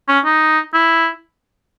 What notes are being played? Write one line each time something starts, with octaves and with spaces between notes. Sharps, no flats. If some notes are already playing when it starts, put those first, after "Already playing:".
C#4
D#4
E4